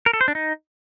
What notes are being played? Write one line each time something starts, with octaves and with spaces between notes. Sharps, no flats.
A#4
A4
C5
D4
D#4